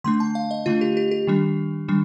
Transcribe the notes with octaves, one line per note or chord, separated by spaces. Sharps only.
D3 A3 D4 C6
A5
F5
D#5
D3 A3 D4 F4
G4
G4
G4
D#3 G3 D4
D#3 G3 D4